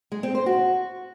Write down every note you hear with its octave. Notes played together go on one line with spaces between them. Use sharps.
G#3
C4
C5
F#4